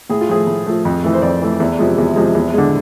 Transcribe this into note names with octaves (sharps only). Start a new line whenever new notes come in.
A2 G#4
F4
F3 A3 G#4
A2
F3 A3
F2
E3 A3
C5
F2 D5
E3 A3
E2
C3 F3 G#3
E2
C3 F3 G#3
E2
D3 G#3